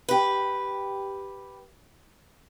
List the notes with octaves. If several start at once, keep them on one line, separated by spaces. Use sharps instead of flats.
G4 B4